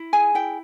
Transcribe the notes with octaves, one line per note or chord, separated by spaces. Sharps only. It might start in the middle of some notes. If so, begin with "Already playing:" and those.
Already playing: E4
G#4 G#5
E4 G5